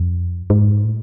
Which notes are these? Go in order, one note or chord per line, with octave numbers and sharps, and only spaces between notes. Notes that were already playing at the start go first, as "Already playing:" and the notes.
Already playing: F2
G#2
A2